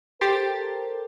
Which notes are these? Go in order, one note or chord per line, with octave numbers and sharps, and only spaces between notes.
G4 A4 A#4 C5 A6